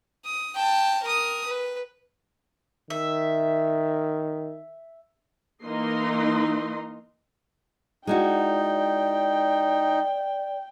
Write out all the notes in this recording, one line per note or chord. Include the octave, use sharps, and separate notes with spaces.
D#6
G5 A5
A#4 D#6
B4
D#3 E5
E3 A#3 D#4 D#5 C6
G#3 D#4 E4 F#4 D5 G5